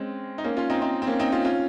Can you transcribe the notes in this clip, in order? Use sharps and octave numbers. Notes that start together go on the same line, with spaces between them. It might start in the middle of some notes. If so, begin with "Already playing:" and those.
Already playing: G#3 C4 C#4
D#4
A#3 C#4
C#4 F4
C4 D#4
C4 D#4
C4
A#3 C#4
C4 D#4
C#4 F4
C#4 F4